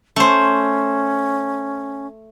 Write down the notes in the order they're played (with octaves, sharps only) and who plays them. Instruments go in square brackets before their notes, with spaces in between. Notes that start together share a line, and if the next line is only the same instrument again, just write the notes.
[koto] A3 C5 [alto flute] C#4